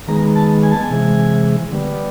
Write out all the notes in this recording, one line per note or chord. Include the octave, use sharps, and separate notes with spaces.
D#3 G#3 B3 A#5
A5
G#5
A5
G#5
C3 E3 G#3
D3 G3 B3